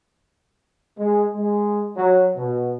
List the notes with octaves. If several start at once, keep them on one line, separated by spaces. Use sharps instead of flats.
G#3
G#3
F#3
B2